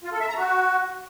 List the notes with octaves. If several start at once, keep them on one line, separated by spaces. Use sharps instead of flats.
F4
A4
E5
A#5
F#4